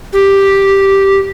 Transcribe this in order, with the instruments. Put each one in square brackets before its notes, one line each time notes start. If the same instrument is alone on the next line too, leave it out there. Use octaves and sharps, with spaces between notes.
[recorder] G4